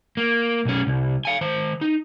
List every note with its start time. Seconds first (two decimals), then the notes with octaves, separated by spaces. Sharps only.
0.17 A#3
0.65 B1 C#4
0.87 C2
1.25 F5 G#5
1.41 D#3 C5
1.81 D#4